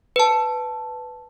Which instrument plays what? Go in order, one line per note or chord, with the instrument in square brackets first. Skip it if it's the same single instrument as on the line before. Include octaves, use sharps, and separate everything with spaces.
[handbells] B4 A5